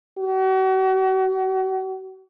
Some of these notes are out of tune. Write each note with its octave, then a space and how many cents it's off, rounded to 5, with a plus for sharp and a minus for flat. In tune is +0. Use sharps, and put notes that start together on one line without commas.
F#4 +40